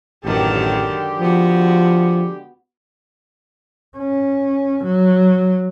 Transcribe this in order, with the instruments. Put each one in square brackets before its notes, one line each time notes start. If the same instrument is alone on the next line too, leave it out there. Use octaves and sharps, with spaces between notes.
[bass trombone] A1 [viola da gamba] F#2 D#3 A4 [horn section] D3 G#3 G4
[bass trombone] F3 [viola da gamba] B3 F#4
[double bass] C#4
F#3